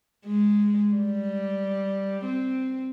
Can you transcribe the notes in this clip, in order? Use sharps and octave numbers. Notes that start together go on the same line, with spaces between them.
G#3
G3
C4